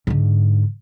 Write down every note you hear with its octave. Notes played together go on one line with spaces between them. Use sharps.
G#2 D3